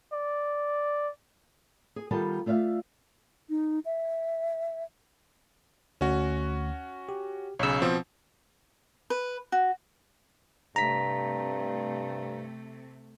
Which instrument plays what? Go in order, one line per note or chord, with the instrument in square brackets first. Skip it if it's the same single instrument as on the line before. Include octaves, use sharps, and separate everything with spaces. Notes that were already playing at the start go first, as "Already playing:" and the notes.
[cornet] D5
[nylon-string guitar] G#4
D#3 G3 B3 F4 A4 A5
A3 F4 D5 E5 F5
[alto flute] D#4
E5
[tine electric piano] D2 [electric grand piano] C#4 F#4
[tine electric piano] G4
[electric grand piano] B1 C#3 [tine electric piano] C#5 E6
[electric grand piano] B2 F3 C4
[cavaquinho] B4
F#4
[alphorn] G2 [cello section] C3 A3 [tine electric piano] A#5 B6